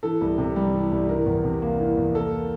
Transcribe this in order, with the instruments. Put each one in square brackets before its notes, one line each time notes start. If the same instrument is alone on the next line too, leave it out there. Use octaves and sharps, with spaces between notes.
[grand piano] E3 A4
C2
C3
G3
E3
C2
E3 A#4
E2
C3
A#3
E3
E2
A#3 A4